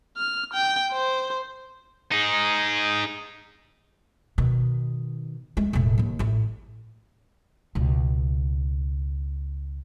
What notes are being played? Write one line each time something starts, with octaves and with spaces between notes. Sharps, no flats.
F6
G5
C5
D#4 G#4
B2 D#3
G#3 A3
E1 A2
D#2 D#3
A1 E4
C#2 B2